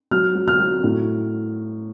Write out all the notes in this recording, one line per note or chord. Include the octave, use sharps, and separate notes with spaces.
F#3 F6
F#3
F6
F#3
A2